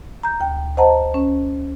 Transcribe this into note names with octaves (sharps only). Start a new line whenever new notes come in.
A#5 G6
D2 G5
C5 D#5 F#5 A5 A#5
C#4